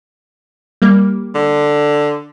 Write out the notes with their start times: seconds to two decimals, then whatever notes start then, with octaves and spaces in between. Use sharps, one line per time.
0.82 G3 A#3
1.35 D3